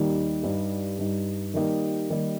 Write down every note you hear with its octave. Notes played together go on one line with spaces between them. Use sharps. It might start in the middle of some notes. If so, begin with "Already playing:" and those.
Already playing: D#2 D#3 G3 D#4
G2 G3 D#4
G2 G3 D#4
D#3 G3 A#3 D#4 G4
D#3 G3 A#3 D#4 G4